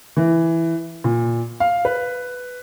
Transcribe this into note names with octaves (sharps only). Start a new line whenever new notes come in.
E3
A#2
F5
B4